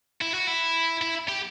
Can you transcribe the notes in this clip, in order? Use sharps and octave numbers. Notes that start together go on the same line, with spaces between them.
E4
F#4
E4
E4
G4